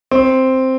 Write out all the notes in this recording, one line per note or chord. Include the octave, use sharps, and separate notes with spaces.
C4